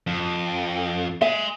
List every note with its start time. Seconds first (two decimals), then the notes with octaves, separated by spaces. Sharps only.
0.07 F2
1.21 E5 G#5 C6